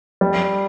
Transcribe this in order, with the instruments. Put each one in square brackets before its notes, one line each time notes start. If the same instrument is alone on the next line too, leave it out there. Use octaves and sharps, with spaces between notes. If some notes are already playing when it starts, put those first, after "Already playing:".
[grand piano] G3